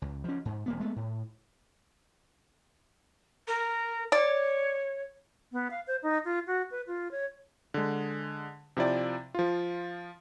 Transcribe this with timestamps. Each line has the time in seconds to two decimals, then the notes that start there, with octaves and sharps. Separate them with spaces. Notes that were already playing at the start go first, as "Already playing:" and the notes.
0.02 C#2
0.24 F3 C#4
0.45 G#2
0.66 E1 A#3 B3
0.79 G#3 A3 B3
0.96 A2
3.47 A#4
4.12 C#5 D5
5.52 B3
5.71 F5
5.87 C5
6.03 D#4
6.25 F4
6.47 F#4
6.71 B4
6.87 F4
7.11 C#5
7.74 D3 G#3
8.77 C3 F3 E4 D5 G5
9.34 F3 F4